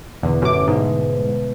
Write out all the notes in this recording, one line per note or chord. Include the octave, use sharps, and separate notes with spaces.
E2 B2 D3
A1 F#2 D6
G#2 B2 G#3